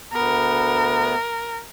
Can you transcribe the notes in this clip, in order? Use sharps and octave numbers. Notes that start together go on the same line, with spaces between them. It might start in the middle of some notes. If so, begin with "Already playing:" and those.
D2 B3 A#4